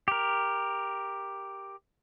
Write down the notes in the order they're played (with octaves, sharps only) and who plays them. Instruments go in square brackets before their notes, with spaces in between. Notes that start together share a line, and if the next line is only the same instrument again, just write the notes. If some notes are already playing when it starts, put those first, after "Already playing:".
[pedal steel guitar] G4 A#4